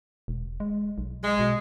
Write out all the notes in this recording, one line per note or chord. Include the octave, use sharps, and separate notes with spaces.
E1
G#3
B1
G#3
B2